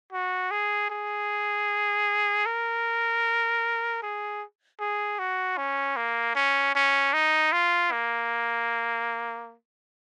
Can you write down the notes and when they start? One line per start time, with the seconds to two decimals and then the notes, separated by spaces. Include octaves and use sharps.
0.12 F#4
0.51 G#4
0.90 G#4
2.46 A#4
4.02 G#4
4.80 G#4
5.19 F#4
5.58 C#4
5.96 A#3
6.35 C#4
6.75 C#4
7.13 D#4
7.52 F4
7.92 A#3